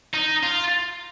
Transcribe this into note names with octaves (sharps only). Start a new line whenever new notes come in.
D#4
F4